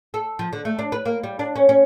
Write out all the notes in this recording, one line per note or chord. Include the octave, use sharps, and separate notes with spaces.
A4
F3
D3
A3
D4
B4
A#3
G3
D4
C#4
C#4